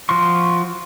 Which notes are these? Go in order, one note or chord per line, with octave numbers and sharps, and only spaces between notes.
F3 F#4 C6 C#6